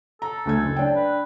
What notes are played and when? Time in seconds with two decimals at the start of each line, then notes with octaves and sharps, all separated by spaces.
0.22 A4 A#5
0.45 D2 A3 G#6
0.63 F#1
0.76 D4 G5
0.96 B4